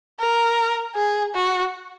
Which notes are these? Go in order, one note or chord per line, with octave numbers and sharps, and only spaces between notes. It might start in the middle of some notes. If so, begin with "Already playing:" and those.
A#4
G#4
F#4